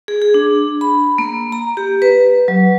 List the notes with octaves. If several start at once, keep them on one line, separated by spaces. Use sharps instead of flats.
G#4
G#4
D4
B5
A#3
A#5
G4
B4
F#3